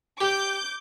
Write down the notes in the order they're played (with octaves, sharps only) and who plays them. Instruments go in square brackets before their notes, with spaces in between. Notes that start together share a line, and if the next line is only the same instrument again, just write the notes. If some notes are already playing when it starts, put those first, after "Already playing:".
[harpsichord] G4 [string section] D6 G6